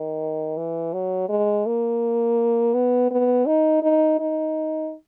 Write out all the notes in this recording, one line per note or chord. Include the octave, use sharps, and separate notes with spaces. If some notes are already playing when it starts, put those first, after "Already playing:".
Already playing: D#3
E3
F#3
G#3
A#3
B3
B3
D#4
D#4
D#4